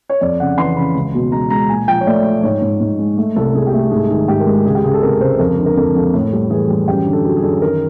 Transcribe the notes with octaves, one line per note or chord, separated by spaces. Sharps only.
C#5
F2 D5
C#3 F#5
E3 C6
C#3 B5
C#2
B2
G#3 A#5
G#3 A#5
A#2 G#5
F3 G5
C#5
A3 D5
F3
G#2 C#5
G#2
G#2
G#3
A3
C2 A4
C2 G#4
G4
A3
G#4
G#2 G#4
D#3 G#4
G#2 G4
A#4
G#3
G#4
C#2 G#4
G4
C#2 G#4
A4
C3 A#4
C#2 C5
F2 A#4
D3
A#4
F2 A4
F2
A2
G3
E3 G#4
G3
F#2 G4
D3
A4
F#3 G#4
G#4
F#2 A4
D#3 A#4